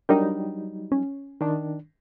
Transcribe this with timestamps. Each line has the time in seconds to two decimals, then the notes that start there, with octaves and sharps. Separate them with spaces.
0.09 F#3 G3 D4 D#4 A#4 G5
0.92 C#4
1.41 D#3 D4